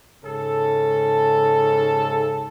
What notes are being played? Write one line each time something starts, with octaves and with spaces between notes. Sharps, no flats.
G#2 C#3 A4